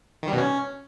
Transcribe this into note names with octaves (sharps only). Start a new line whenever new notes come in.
D#3
G3
B2
C#4